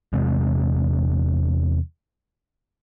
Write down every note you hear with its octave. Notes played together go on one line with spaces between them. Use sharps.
E2 C3 G#3